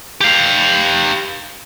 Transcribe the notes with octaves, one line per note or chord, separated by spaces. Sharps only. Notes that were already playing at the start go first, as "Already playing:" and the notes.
G4 F5